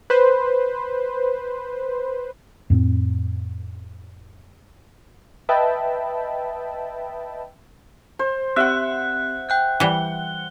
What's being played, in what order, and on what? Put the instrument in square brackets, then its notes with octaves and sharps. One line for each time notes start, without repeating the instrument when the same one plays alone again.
[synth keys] B4 C5
[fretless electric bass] F2 A2 B3 C4
[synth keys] B4 D#5 E5 G5 A5 B5
[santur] C5
[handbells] C4 G4 D5 [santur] E5 F#5 [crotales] F#6
[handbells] G5 F#6 G6
[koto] E3 G3 [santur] F#5 [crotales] G7